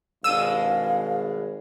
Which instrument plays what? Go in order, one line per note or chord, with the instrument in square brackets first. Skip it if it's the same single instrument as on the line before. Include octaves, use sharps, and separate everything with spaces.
[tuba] G#1 [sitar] G2 B2 G#3 [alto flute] F5 [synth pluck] E6 D#7